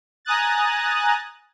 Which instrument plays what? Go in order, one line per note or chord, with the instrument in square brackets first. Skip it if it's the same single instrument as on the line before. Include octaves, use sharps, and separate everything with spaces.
[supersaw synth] G#5 A#5 D#6 F#6 A6